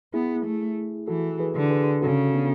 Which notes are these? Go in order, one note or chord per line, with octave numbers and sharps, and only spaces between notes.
B3 E4 G#4
A3
E3 F#4 A4
G#4 B4
D3
G#4 B4
C#3 F#4 A4
B3 D4